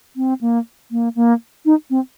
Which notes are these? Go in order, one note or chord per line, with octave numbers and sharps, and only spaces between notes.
C4
A#3
A#3
A#3
D#4
C4